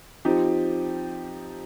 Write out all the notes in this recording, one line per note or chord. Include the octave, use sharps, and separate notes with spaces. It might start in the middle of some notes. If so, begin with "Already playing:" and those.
F3 C4 D#4 G4